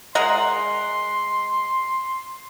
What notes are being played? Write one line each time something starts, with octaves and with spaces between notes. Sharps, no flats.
G#3 A#4 F#5 C6